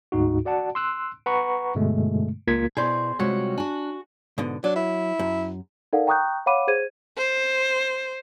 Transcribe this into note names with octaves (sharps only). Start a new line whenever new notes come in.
D2 G#2 D#4 F#4
F#4 D5 F#5 A5
C6 E6 F#6
B4 F#5 A#5 B5 C#6
G2 B2 D3 G#3 A3
C#2 A#3 F4 A#4 G#6 B6
B2 E4 G#4 C5 D5
C3 G3 G#3 F4 F#4 C#5
D4 F#4 G#5
G#2 B2 D3
F#3 D4
E4
F#2
D#4 A4 A#4 D5 F5 F#5
G5 A#5 C#6 D#6 F#6 G6
C#5 F5 F#5 B5 D6 D#7
G#4 C5 G#6 D#7
C5